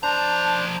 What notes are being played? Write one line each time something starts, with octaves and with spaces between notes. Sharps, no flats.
F3 D4 C5 A5 A#5